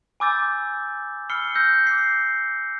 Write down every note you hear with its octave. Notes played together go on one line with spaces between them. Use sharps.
G#5 B5 D6 E6 G6 A6
B5 E6 F6 C7 C#7 G7
E6 F6 G6 A#6
D6 F#6 C7